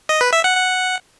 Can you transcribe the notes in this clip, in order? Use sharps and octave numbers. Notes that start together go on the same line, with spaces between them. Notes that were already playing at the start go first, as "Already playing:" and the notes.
D#5
B4
E5
F#5
F#5